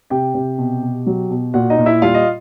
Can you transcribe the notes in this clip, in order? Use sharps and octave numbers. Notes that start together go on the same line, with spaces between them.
C3 G4 G5
C3
B2
B2
F#3
B2
A#2 F#4 F#5
D#4 D#5
A#2
E4 E5
G3 F4 F5
D#5